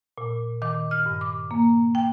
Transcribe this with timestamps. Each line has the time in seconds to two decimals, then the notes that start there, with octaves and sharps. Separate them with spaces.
0.18 A#2
0.62 D#3 D6
0.91 F6
1.06 G2
1.21 D6
1.51 A#3
1.95 G5